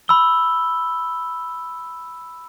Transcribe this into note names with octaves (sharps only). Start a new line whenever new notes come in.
B5 E6 G7